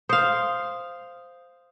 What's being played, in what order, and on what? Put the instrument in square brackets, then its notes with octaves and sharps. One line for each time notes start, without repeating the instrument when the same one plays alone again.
[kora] C5 F5 [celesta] D#6